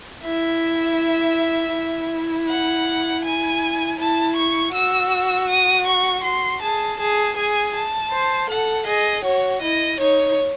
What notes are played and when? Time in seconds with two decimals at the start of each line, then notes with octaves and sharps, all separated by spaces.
0.24 E4 E5
1.74 E4
2.49 F#5
3.25 G#5
3.99 E4 A5
4.36 C#6
4.74 F#4 E6
5.49 D#6
5.87 C#6
6.24 F#4 C6
6.62 G#4 A5
6.99 G#4 A5
7.37 G#4 G#5
7.74 A5
8.12 C5
8.50 A4 F#5
8.87 G#4 D#5
9.24 F#4 C#5
9.62 E4 D#5
9.99 D#4 C#5